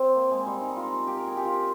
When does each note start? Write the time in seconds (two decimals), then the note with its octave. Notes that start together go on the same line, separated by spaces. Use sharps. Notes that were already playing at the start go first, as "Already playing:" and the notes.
Already playing: C4
0.16 A#3
0.31 G#3
0.46 G3
0.61 D#4
0.77 F4
1.07 G4
1.17 A#4
1.27 G#4
1.37 G4
1.45 F4
1.52 G4